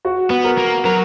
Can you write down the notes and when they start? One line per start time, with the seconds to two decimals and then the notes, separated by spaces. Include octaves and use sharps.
0.05 F#4
0.31 B3
0.44 A#4
0.58 A#3
0.85 F#3 A#4